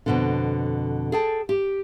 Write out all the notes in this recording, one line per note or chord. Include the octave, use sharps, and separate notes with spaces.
F2 B2 D3
G#4 A4 G5 A5
G4